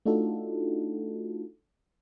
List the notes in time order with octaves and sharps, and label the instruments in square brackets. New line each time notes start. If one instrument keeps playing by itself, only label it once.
[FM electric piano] A3 D4 D#4 F4 F#4 A4